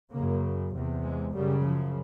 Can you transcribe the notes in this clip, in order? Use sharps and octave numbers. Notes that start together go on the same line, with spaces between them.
C#3 A#3
F#2
E2 C3
G#3
F#2 C#3 G3
F3